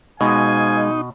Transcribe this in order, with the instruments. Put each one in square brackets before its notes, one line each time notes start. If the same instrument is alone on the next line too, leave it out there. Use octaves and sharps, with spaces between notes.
[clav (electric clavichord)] B2 [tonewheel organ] G#3 [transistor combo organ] D#4 [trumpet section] C5 F5 G#5